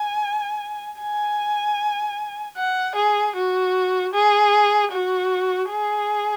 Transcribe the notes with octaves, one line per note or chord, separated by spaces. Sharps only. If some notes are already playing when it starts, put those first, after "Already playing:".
Already playing: G#5
G#5
F#5
G#4
F#4
G#4
F#4
G#4